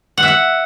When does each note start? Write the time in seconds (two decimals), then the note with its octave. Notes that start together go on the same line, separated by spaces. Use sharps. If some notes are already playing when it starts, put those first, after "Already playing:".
0.17 F#5
0.23 E5
0.28 F#5